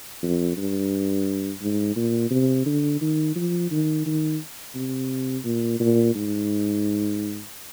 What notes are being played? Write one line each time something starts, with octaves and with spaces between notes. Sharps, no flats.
F2
G2
G#2
A#2
C3
D3
D#3
F3
D#3
D#3
C3
A#2
A#2
G#2